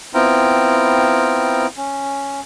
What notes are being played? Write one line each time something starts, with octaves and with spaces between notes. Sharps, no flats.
B3 C4 E4 F4 G5 A#5
C#4